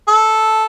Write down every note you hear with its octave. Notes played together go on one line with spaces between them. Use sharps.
A4